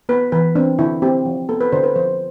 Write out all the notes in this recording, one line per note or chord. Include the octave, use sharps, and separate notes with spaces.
B3 B4
E3 B4
C4 D4
D3 E4
C4 G4
F3
B3 A4
B4
D3 C5
B4
F3 C5